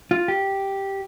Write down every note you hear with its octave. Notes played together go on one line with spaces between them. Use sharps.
F4
G4